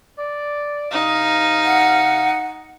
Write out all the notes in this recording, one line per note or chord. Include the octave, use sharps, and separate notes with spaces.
D5
C3 D#4 F5
F#5